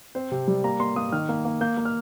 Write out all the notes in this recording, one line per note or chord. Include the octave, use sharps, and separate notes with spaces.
C4 C5
C3
G3
A#3 A#5
A#3 C6
A#3 D#6
D#3 F6
A#3
A#3
A#3 G6
A#3
F6